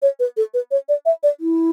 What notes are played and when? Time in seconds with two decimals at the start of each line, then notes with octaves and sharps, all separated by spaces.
0.02 C#5
0.20 B4
0.37 A4
0.54 B4
0.71 C#5
0.89 D5
1.06 E5
1.23 D5
1.40 E4